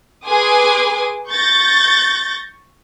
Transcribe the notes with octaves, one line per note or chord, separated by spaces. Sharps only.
G#4 B4 G#5 C6 D6 D#6
C#6 G6 A6 A#6